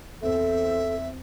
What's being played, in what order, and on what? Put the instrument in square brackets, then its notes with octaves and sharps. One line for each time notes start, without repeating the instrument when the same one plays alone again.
[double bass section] E2 C4 [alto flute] A4 [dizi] E5